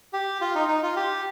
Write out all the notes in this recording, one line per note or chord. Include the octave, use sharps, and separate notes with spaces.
G4
F4
D#4
D#4
F4
G4